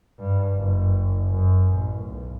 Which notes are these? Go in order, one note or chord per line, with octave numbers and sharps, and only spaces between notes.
G2
F#1
F#2
A1
B1